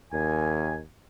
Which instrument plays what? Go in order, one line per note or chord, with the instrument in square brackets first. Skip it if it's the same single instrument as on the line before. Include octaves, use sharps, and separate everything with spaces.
[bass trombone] D#2 [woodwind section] D#3 G#5